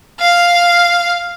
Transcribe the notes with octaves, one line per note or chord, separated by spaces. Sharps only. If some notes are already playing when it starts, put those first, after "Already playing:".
F5